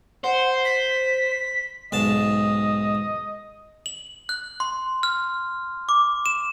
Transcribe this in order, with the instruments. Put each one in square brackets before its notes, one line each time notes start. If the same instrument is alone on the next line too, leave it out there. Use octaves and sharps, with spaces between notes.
[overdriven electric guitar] C5 [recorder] F#5
[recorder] B6
[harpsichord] B1 G#2 A5 [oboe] D#5
[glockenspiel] F#7
F#6
C6
F6
D6
E7